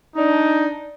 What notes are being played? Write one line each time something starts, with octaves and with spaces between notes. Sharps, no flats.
D4 D#4